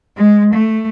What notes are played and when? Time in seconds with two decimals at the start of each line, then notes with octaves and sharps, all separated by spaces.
0.17 G#3
0.53 A3